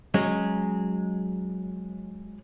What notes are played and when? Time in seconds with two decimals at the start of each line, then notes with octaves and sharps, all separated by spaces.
0.14 F#3 G#3 C#4